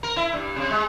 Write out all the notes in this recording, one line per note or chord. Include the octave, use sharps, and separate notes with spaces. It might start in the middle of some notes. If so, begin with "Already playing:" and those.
A#4
E4
G2
C3
G#3